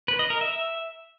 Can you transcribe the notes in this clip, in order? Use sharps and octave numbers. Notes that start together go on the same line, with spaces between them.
B4
D#5
A#4
E5